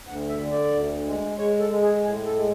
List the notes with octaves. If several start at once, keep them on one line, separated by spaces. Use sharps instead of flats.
D2 F#5
E5
D3
D5
D2
G#3
G#3 C#5
A4
G#3
G#4
A2 G#4
A4
G#3